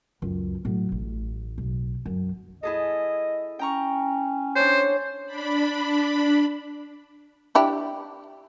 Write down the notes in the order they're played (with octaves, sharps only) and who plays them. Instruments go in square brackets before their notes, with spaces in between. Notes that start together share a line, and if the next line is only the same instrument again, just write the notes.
[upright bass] C#2 F#2
A2 F#3
A1
B1
F#2
[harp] E4 G#4 A4 [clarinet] D#5
[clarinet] C#4 [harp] G5 A#5 C#6
[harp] D4 C#5 [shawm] C5
[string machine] D4 B5
[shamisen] D4 E4 G4